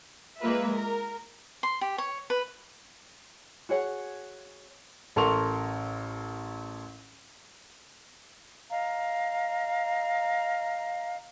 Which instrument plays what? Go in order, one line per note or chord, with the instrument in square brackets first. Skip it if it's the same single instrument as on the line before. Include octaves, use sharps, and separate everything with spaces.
[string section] G#3 A#3 F4 B4 E5
A#4
[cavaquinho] C6
G4
C#5
B4
[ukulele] F#4 G#4 C#5 F#5
[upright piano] A1 A4 A#4 C6 C#6 F7
[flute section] D#5 F5 A#5